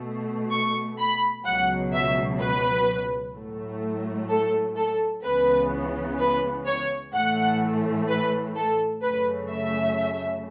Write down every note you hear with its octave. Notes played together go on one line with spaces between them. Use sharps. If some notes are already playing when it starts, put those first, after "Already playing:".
Already playing: B2 A3
C#6
B5
C#2 B2 F#3 F#5
E5
B4
A2 F#3 A3
A4
A4
C#2 C#3 E3 B3 B4
B4
C#5
A2 E3 A3 F#5
B4
A4
F#2 C#3 A3 B4
E5